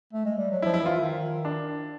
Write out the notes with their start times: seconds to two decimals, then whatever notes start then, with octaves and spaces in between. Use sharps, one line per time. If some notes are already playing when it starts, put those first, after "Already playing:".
0.13 A3
0.25 G#3
0.37 G3
0.51 F#3
0.62 E4
0.66 F3
0.74 E4
0.82 E3 F4
0.97 D#3
1.45 D4